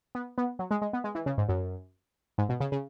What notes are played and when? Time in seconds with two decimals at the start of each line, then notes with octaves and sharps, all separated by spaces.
0.15 B3
0.38 B3
0.59 F#3
0.71 G#3
0.82 G#3
0.93 B3
1.04 G#3
1.15 E3
1.26 C#3
1.38 G#2
1.49 F#2
2.38 G#2
2.49 B2
2.60 C#3
2.72 C#3